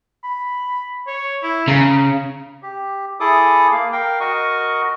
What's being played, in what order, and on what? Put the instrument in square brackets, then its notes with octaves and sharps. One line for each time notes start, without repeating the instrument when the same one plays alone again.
[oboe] B5
C#5
E4
[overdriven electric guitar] C#3 [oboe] A#5
[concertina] G4
E4 G#4 A4 D6 D#6
A#3 F5
A#4 F5 G5
F#4 A#4 D#5 C#6